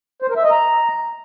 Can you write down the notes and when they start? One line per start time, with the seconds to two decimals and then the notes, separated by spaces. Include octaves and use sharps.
0.22 C5
0.29 A#4
0.36 E5
0.44 D#5
0.51 A#5